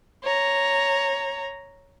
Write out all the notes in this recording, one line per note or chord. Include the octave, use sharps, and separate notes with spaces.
C#5 A#5